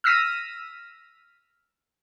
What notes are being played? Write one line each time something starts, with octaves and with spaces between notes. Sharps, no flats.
E6 F6 A#6 B6 D#7